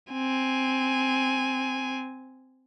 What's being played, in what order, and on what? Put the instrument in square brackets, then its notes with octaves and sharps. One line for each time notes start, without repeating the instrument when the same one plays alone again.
[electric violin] C4 G#5